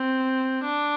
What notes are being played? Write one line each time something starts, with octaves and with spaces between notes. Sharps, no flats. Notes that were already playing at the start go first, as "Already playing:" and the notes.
Already playing: C4
D4